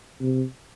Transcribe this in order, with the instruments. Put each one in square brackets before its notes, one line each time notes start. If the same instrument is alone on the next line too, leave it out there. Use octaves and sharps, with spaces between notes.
[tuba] C3